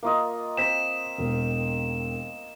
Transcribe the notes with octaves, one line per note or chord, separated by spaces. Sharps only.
A#3 F4 A#4 D#5 E5
C4 G6 B6 E7
E1